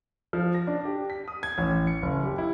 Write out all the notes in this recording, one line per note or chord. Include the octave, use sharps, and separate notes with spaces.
F3
A#6
D4
G4
B6
D#6
G#6
A1
C#7
F#1
G4
E4